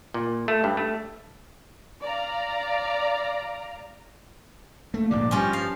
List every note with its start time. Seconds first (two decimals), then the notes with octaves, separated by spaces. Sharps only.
0.14 A#2
0.48 A3
0.64 G2
0.77 A3
2.03 D5 F5 A#5
4.94 A3 A#3
5.11 A#1 G#2 D3 D5
5.31 G2 F3 G3 C#4 G4
5.53 G3 F5